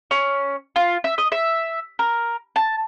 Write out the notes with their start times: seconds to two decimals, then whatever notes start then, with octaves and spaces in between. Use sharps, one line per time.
0.11 C#4
0.76 F4
1.04 E5
1.18 D#5
1.32 E5
1.99 A#4
2.56 A5